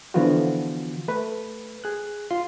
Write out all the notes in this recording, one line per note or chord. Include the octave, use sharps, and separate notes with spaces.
D3 E3 F3 B3 F4 F#4
A3 B4
G#4 F#6
F4 C6